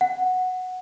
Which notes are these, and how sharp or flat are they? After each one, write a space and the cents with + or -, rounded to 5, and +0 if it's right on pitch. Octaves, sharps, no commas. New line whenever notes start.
F#5 -5